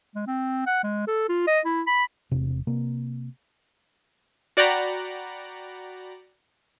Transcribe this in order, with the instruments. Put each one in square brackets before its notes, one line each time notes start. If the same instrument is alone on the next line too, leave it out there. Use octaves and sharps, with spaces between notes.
[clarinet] G#3
C4
F#5
G#3
A4
F4
D#5
E4
B5
[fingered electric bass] E1 C3
C3 A#3
[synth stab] F#4 D5 F#5 G5 A#5 B5